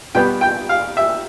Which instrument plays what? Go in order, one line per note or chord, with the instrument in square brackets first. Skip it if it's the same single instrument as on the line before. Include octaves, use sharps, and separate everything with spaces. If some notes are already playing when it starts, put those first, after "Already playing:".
[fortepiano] B2 G3 B3 G5
G5
F5
E5